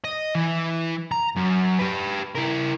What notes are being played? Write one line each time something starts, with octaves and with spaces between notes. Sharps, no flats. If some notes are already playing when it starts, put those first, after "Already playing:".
D#5
E3
A#5
F#2
G4 B4
E4 A#4